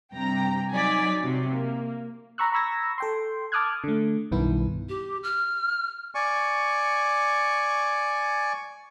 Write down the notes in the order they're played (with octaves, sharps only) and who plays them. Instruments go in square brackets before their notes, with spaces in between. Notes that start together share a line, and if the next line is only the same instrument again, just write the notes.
[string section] G2 C3 G5 A#5
F#3 D#4 D5 G#5 B6
C3 F#3
A#3
[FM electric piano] A#5 B5 C#6 E6 F#6
A#5 B5 C#6 E6 G#6 A#6
A4 G5 C6
A5 D6 D#6 F6 F#6 G#6
D3 A3
B1 G2 D#3 B3 E4
[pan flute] G4
F6
[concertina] D5 G#5 C#6